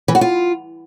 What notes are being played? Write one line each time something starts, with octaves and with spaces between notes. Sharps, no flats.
E3
F#4
F4